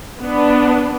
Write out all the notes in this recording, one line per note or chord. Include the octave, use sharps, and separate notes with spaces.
B3 D4